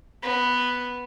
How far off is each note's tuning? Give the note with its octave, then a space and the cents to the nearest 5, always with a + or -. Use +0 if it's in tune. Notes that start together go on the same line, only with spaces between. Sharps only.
B3 +0